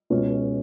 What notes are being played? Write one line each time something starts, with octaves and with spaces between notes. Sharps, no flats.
C#2 B2 G#3 C#4